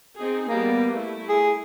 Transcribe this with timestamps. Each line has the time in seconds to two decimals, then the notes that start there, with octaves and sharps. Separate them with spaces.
0.17 C4 D#4 G#4
0.48 G3 A#3 B3
0.91 A3 E4
1.29 G#4